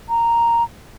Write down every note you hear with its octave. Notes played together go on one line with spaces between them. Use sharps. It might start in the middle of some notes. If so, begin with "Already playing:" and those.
A#5